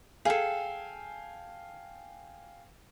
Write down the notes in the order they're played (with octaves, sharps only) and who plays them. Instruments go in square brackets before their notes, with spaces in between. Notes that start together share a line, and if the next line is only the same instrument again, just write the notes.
[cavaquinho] G#4 A4 [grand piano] F5 G5 G#5